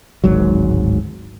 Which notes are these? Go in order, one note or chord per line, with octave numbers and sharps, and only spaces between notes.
D1 G#1 G#2 F#3